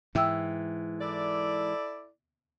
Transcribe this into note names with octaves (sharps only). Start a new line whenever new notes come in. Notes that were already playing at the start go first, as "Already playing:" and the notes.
G#2 E3 E5 G5 E6
E4 A4 D5